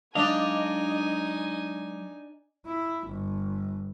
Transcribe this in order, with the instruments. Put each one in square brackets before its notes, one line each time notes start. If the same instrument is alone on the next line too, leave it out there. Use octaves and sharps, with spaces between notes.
[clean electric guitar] F#3 G#3 F5 [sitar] D4 [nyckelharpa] D#4 G#5 [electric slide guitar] D#5
[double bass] E4
G1